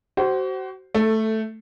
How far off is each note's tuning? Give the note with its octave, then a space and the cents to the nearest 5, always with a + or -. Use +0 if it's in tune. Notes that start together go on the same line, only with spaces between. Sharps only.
F#4 +35 C5 +0
A3 +0 A4 +15